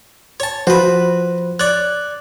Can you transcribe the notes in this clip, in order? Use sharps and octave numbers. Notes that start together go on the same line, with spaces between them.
C#5 A5
F3 F#4 B4 C5
C#5 D5 F#6